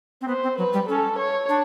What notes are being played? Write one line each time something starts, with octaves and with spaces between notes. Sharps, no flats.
C4
B3 C5
C4
F#3 B4
G3
C#4 A4
C#5
D4